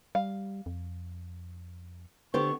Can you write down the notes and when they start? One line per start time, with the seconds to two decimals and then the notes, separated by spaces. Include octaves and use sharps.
0.15 G3 F5
0.66 F2
2.34 D3 B3 G4 C5 C#6